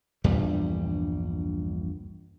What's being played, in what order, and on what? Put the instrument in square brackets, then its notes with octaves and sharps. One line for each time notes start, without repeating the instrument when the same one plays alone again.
[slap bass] A#1 E2 G2 G3